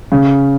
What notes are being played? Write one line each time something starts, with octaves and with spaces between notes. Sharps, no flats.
C#3